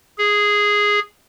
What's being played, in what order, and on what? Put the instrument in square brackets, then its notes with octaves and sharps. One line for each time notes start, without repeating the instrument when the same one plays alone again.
[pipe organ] G#4